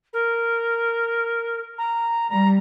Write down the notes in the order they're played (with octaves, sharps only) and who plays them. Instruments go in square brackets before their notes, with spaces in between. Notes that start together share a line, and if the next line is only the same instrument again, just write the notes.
[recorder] A#4
A#5
[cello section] G3 [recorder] A#5